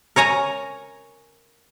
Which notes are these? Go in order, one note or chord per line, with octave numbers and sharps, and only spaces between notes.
A#4 C#5 G#5 A#5